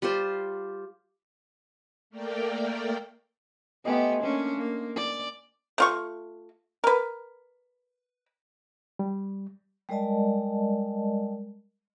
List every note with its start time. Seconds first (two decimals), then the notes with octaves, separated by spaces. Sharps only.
0.02 G3 F4 G4 C5
2.10 A3 A#3 A#4 D5 G5
3.85 A3 B3 G4 D#5 G#5 C6
4.22 A#3 C#4 D4
4.57 A#3
4.96 D5
5.78 A3 F4 C#6
6.84 A#4 B4
8.99 G3
9.89 G3 G#3 A#4 D5 D#5 A5